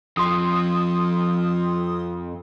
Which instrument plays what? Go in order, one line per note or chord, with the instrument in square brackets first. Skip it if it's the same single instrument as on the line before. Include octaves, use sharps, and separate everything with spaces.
[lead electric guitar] F2 F3 [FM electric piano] C6 D#6